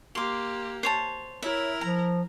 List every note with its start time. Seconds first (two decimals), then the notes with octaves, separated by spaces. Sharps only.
0.15 A#3 G4 C6 D6
0.83 C5 C#5 A5
1.42 E4 A#4 C#5 E5
1.81 F3 A#5